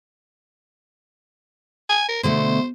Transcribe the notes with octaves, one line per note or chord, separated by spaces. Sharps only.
G#5
A#4
B2 D3 A3 C5